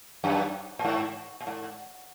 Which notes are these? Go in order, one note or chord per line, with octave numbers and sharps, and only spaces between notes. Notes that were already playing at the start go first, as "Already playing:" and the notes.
F#2
A#2
G#2
A#2
G#2